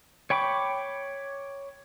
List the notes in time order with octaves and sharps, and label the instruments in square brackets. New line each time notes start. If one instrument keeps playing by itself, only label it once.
[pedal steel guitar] C#5 G5 B5 C#6 D6